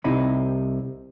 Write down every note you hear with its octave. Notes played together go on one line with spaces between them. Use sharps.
C2 C3 C4 D#4 E4 B5